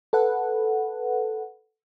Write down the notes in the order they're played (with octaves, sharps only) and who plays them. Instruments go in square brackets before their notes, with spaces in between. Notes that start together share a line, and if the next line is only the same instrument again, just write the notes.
[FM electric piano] A4 B4 F#5